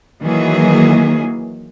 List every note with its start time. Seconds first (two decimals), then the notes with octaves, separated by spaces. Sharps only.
0.22 D#3 E3 F#3 A#3 G#4